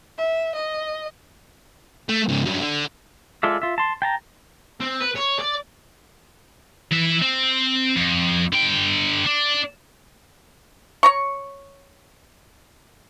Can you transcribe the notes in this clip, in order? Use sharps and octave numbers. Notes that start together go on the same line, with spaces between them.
E5
D#5
A3
G#2 C#3
G2 F#3
D3
G#3 F4 A4 D5 E5
F4 E5
A5 C6
G5 A5 A#5
C4
B4
C#5
D5
E3 E5
C4
F2
D3 G5
D4
C#5 A#5 C#6